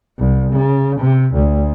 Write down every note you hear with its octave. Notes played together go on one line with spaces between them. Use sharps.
C2
C#3
C3
D2